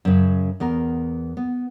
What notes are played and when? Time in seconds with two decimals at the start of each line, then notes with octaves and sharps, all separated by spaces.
0.05 F#2 C#3
0.60 E2 B3 A#4
1.37 B3